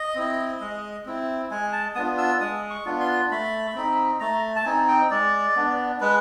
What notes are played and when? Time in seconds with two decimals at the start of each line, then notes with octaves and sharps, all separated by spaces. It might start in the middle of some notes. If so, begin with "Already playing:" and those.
Already playing: D#5
0.15 C4 E4
0.60 G#3
1.06 C4 E4
1.51 G#3 G#5
1.72 A5
1.95 B3 D4 F4 D#6
2.18 E6
2.40 G#3 D#6
2.70 C#6
2.85 B3 D4 F4
3.00 C6
3.31 A3 B5
3.75 C4 D#4
4.20 A3 A#5
4.56 A5
4.65 C4 D#4 G#5
4.88 G5
5.11 G#3 D5
5.56 B3 D4
6.00 G#3 B4